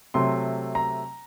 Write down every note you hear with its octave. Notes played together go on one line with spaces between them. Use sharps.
C3 F#3 A3 C6
A#5